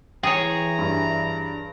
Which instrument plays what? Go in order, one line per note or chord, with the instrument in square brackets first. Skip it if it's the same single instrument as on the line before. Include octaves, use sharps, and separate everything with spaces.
[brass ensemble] E3 [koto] G#4 C#5 [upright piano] G5 D#6 [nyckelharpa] A#5
[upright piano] G2